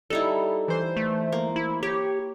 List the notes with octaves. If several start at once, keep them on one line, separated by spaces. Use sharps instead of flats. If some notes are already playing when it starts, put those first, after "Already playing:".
G3 D#4 E4 A4
E3 C5
A3
A#3
E4
G4 C#5